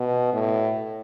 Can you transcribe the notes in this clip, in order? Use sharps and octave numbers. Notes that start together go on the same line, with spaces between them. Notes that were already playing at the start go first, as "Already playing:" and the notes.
Already playing: B2
A2